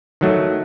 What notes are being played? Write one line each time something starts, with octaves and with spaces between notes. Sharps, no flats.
D#3 F#3 A3